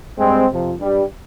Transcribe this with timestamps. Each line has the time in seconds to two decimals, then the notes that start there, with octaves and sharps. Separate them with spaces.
0.19 G2 G3 G#3 C4
0.50 F2 C3 F3
0.79 G2 G3